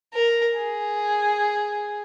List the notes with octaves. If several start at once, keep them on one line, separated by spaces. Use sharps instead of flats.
A#4
G#4